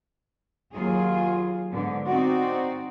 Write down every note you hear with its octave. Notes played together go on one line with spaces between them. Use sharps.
D#2 F#3 F4 G#4
G#2 D3 B3
C4 D#4 F#4 D5